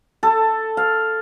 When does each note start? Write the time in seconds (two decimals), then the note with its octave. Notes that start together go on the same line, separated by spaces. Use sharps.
0.23 A4
0.77 F5